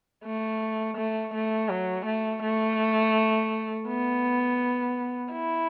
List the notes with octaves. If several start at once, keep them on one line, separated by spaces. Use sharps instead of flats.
A3
A3
A3
F#3
A3
A3
B3
E4